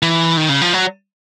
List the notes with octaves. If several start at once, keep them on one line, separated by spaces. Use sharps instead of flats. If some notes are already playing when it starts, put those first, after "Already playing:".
E3
D#3
C#3
F3
F#3